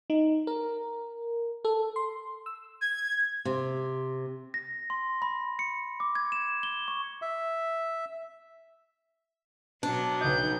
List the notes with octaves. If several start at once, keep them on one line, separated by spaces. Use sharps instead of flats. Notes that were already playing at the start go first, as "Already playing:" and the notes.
D#4
A#4
A4
C6
E6
G#6
C3
A#6
C6
B5
C#7
D6
G#6
E7
G7
C#6
E5
B2 F#3 D4
B1 C#3 D#5 G6